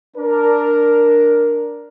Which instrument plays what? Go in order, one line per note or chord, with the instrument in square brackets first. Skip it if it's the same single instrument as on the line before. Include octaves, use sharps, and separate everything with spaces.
[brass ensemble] D4 A#4